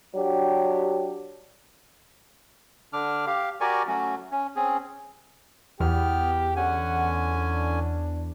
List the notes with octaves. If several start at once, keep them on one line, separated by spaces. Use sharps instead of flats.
F#3 D4 G4
D3 D4 D6 F6
G4 F5
F#4 G4 A#4 D5 G#5 C#6
F#3 A3 C#4 F#4
C#4
C4 C#4 G#4
E2 B3 G4 F6
D3 C#4 F#5 G#5
D4